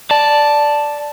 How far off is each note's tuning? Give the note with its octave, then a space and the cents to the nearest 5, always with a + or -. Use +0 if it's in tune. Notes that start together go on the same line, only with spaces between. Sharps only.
D5 +0 A5 +0